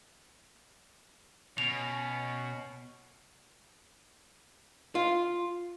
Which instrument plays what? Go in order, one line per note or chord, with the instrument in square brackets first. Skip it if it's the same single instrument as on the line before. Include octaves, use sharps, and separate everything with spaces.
[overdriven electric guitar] B2 [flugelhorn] C#4 [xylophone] F7
[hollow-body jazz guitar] F4